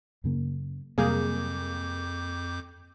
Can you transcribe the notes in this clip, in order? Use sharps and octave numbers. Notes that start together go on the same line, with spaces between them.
F#2 C#3 A#3
F2 C3 F#3 G3 A#3 G#4 D6 G6